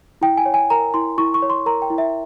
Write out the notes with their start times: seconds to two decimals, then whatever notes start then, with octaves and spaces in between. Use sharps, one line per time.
0.21 E4 G5
0.37 G#5
0.46 C#5
0.54 G#5
0.70 A#4 A#5
0.94 E4 C6
1.18 E4 C#6
1.34 C#6
1.42 C#5
1.50 C6
1.66 A#4 A#5
1.82 G5
1.90 E4
1.98 E5